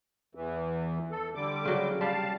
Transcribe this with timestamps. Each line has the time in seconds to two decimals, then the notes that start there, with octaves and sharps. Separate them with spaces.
0.35 E2 E3
1.11 A4
1.35 D3 G3 D6
1.65 C#3 F#3
2.01 G3 F5 A5